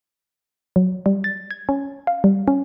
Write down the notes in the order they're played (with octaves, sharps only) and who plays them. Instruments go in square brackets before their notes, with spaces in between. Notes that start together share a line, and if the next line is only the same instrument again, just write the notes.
[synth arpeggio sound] F#3
G3
A6
G#6
C#4
F5
G3
C#4